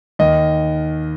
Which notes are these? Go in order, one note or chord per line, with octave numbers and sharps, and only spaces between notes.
D#2 D#3 D#5